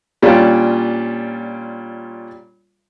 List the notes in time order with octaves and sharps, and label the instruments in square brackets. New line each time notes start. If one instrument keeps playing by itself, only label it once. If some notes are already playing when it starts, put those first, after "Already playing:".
[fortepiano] A#2 G3 C#4 D4 F4